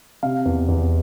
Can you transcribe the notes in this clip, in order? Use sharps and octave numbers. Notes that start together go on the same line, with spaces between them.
C3 F5
E2
E2